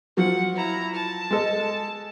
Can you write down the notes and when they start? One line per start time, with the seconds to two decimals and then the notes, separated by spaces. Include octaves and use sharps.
0.17 F3 F#3 F#5
0.55 E4 A#5
0.94 A5
1.30 G#3 A4 D#5